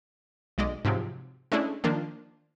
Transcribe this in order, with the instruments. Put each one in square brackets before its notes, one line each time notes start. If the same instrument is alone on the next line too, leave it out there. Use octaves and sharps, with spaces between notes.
[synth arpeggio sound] B1 G#3 D5 D#5
G#2 C3 F3 F#3 C4
G#3 A3 C#4 D4 E4
D#3 F3 A#3 D4